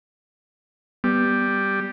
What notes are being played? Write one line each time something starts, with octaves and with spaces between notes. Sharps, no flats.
G3 B3